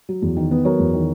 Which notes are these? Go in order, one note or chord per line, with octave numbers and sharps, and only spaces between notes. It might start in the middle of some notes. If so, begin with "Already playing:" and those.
F#3
E2
D#3
B3
F#3 A#4 C#5
E2
D#3